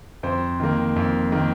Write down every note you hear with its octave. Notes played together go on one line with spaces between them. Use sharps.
F2 C5
D#3 A#3
F2
D#3 A#3